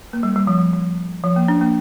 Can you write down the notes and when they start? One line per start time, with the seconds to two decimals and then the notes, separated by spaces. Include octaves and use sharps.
0.13 A#3
0.23 G3
0.36 G3
0.47 F3
0.73 F3
1.24 F3
1.36 A#3
1.48 D4
1.61 A#3